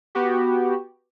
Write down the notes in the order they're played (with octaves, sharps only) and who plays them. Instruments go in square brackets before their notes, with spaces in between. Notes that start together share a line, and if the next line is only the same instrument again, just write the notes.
[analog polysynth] B3 F#4 G4